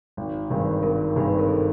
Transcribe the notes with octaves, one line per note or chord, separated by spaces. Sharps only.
G#1
G2 D#3 G#3 C4
G#1 A#4
G2 D#3 G#3 C4 C5
B4
A#4
A4